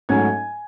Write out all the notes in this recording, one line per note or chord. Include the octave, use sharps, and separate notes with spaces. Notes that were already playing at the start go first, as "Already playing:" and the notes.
G#2 F#3 A3 C#4 G#5 G#6